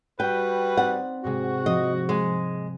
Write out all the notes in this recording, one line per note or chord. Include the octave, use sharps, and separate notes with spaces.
G3 F#4 B4 G5
C4 D#4 D5 F#5
G#2 C3 G#3 F#4
F3 D#5
G#3 F#5 G#5